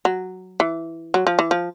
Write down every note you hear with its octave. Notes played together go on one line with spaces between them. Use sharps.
F#3
E3
F#3
F3
E3
F3